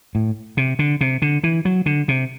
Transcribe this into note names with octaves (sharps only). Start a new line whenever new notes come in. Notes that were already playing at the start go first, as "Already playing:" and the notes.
A2
C3
D3
C3
D3
E3
F#3
D3
C3